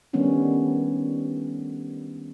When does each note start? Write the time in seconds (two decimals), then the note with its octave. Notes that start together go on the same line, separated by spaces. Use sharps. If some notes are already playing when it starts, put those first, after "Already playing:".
0.13 D#3 G3 A3 B3 C#4 D4